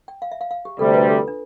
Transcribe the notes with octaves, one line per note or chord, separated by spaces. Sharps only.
G5
F5
E5
F5
F5
G4
D2 C3 G3 A4
B4
A4
F4
D4